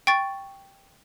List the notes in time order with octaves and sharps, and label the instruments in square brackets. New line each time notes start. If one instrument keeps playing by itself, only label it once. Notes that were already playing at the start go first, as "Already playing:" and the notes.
[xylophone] G5 C#6 A6